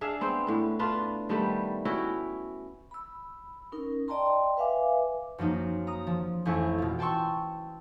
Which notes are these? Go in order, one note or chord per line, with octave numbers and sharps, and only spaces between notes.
D4 G#4 E5 F5
B3 C4 C5
A2 B3
D4 F4 B4
D#3 G3 A3 B3
C#4 E4 F#4 G5
B5 E6
C#4 D#4 A#4
D5 D#5 G5 A5 A#5 C6
B4 E5 F5 G#5 D6
F#2 F3 A#3 D#4
A#5 D#6
F3
A1 F2 E4 C5 G#5 C#6
B2 F4
G5 A5 C6 C#6 E6